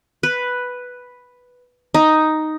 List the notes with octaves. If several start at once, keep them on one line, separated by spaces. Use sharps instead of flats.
B4
D#4